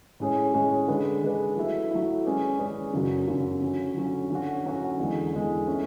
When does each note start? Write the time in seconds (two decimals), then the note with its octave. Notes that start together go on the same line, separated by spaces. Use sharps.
0.20 A2 G#3 C#4 G#4 C#5
0.54 A2 G#3 C#4 G#4 C#5
0.88 D3 G#3 D4 G#4 B4
1.22 D3 G#3 D4 G#4 B4
1.57 F#3 A3 E4
1.91 F#3 A3 E4
2.25 G#3 C#4 G#4 B4 D5
2.59 G#3 C#4 G#4 B4 D5
2.93 F#2 C#3 F#3
3.28 F#2 C#3 F#3
3.62 D3 F#3 C#4
3.96 D3 F#3 C#4
4.30 D3 F#3 C#4 F#4
4.64 D3 F#3 C#4 F#4
4.99 E2 D3 G#3
5.33 E2 D3 G#3
5.67 E3 A3 C#4 E4